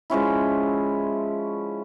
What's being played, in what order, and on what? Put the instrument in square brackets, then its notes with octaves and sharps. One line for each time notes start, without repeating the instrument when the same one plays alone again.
[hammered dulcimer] F3 G#3 C#4 E4